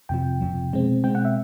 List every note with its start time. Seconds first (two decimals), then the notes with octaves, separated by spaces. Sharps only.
0.09 F2 C3 F3 G5
0.41 F2 C3 F3
0.73 B2 G#3 C4
1.04 B2 G#3 C4 G5
1.15 F#5
1.25 E5